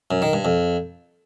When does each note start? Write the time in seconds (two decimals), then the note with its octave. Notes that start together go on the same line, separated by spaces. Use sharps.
0.11 F#2
0.22 D#3
0.33 G2
0.45 F2